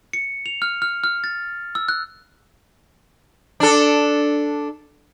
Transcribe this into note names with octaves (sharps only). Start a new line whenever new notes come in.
C#7
F7
F6
F6
F6
A6
E6
F#6
D4 A4